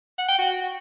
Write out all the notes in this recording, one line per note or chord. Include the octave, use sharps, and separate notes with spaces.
F#5
G5
F#4